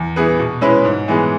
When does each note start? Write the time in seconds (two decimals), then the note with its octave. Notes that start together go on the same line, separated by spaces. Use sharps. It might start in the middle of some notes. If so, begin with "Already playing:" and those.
Already playing: E2
0.16 E3 B3 G#4 B4
0.39 B2
0.61 G#3 C#4 E4 B4
0.85 G#2
1.08 E3 G#3 B3 G#4